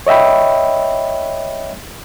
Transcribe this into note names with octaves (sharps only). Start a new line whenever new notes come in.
C#5 D#5 E5 G5 B5